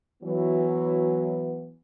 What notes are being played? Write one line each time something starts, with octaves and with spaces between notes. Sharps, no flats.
E3 F#3 B3